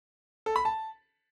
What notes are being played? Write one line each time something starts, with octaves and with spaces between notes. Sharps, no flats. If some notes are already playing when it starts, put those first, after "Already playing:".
A4
B5
A5